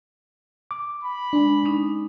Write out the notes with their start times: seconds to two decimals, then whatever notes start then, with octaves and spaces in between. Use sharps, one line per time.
0.71 D6
1.04 B5
1.33 G#3 D4 C6
1.65 C#4 D#4